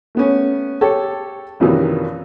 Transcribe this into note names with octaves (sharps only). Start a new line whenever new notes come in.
A3 B3 C#4
G4 A4 C#5
A#1 F#2 C3 D#3 E3